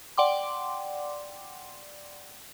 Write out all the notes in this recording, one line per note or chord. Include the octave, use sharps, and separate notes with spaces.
D5 F#5 G5 C6 D6